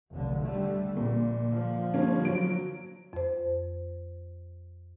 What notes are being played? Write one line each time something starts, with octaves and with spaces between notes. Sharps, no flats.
F1 B1 D3
D3 G3 A3
A#1 A#2
D3 F3
G2 A#3 C#4
F#3 D7
F2 C5